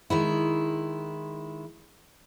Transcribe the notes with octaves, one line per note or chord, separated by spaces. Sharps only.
D#3 G#3 E4